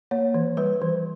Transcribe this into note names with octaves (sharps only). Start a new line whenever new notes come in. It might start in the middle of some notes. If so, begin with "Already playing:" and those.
A#3 C#5
E3
G3 B4
E3